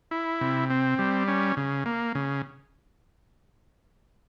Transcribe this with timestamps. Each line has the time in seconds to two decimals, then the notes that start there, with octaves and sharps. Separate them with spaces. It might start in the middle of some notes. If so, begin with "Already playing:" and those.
0.11 E4
0.41 C3
0.70 C4
0.99 G3
1.28 C#4
1.57 C#3
1.86 A#3
2.15 C#3